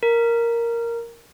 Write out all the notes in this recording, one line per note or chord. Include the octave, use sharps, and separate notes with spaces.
A#4